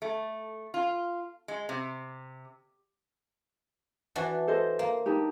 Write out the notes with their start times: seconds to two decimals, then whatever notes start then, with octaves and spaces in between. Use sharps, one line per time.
0.02 A3
0.74 F4
1.48 G#3
1.69 C3
4.16 E3 D4 F#4
4.47 A4 C5 D#5
4.79 A#3
5.06 D4 D#4 G4